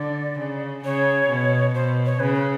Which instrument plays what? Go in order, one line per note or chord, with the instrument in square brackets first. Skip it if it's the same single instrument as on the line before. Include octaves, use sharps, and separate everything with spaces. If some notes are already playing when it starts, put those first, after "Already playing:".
Already playing: [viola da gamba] D3 [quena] D5
[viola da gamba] C#3
[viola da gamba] C#3 [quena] C#5
[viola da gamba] B2
[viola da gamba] B2 [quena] C5
[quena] C#5
[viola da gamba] C#3 [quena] B4
[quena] B4